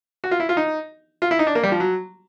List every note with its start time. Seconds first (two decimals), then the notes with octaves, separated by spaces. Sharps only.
0.24 F#4
0.31 F4
0.40 E4
0.49 F4
0.57 D#4
1.22 F4
1.31 E4
1.39 D#4
1.47 D4
1.55 A#3
1.63 G3
1.72 F3
1.80 F#3